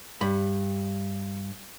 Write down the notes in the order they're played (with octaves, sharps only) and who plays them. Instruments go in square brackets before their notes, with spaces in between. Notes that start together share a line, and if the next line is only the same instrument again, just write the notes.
[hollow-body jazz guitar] G2 B5